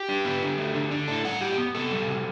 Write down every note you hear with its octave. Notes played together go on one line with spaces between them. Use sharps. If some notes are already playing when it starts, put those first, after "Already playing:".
Already playing: G4
D4
B3
D3
A3
D3
D4
A2 A4
G3 F#5
A2 G4
B3
C3 A4
G3
C3